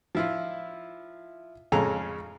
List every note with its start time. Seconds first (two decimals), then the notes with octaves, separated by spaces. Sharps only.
0.15 F3 E4 F4
1.72 F2 C#3 G#3 A4 G#5 A#5